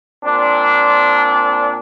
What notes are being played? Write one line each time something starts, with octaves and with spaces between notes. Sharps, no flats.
A#2 C4 D4